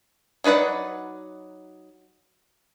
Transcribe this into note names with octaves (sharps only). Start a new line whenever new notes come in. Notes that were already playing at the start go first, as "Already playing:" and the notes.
F#3 D#4 B4 D5 F#5